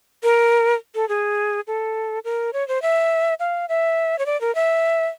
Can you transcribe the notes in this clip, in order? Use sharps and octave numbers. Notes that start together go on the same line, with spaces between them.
A#4
A4
G#4
A4
A#4
C#5
C5
E5
F5
E5
C#5
D5
A#4
E5